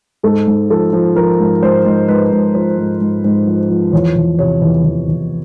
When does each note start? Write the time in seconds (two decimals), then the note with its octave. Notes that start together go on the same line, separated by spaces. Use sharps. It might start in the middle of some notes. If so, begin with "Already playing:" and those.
0.23 G#2 A4
0.47 G#2
0.70 F3 A4
0.93 F3
1.16 F3 A#4
1.39 G#2
1.62 G#2 C5
1.86 G#2
2.08 G#2 B4
2.31 G#2
2.54 F3 C5
2.78 G#2
3.01 G#2
3.24 G#2
3.47 F3
3.70 F3
3.93 E2 C#5
4.16 E2
4.39 C3 C#5
4.62 E2
4.84 E2
5.08 E2